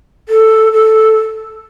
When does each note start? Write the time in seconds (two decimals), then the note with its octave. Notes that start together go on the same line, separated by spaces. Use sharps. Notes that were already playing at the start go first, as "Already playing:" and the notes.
0.29 A4
0.73 A4